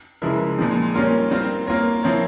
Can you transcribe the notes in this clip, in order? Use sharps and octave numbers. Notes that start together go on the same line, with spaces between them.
C#3 F3 G#3 E4 A#4
A#2 F3 G#3 C4
G3 A#3 C#4 F4 A#4
G3 C4 F4 A#4
A#3 F4 A#4 C#5
F3 C4 E4 A#4 C#5